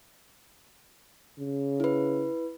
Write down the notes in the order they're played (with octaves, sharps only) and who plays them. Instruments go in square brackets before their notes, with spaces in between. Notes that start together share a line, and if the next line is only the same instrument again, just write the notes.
[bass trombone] C#3
[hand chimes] E4 B4